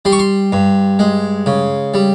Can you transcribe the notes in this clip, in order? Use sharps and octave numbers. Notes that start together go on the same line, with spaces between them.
G3 C6
C#6
C6
G2
G#3
C#3
G3